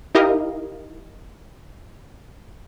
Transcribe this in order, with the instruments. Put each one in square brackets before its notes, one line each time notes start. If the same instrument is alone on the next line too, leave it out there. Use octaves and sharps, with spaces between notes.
[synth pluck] D#4 E4 G4 A#4 D#5 F5